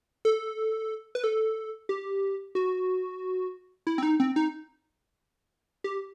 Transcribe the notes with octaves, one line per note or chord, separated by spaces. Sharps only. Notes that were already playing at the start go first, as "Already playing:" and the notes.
A4
B4
A4
G4
F#4
E4
C4
D#4
C4
D#4
G4